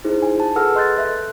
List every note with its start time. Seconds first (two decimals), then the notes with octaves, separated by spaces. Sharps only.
0.05 D#4 E4 G#4 C5
0.22 G#5
0.35 F4 A5
0.56 G#4 A4 B4 F#5 E6 F6
0.75 B4 D#5 C6 F#6 G6 A6
0.97 A4 E5 F#6